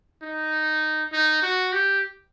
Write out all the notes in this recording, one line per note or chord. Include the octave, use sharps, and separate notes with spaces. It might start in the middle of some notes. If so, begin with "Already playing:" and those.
D#4
D#4
F#4
G4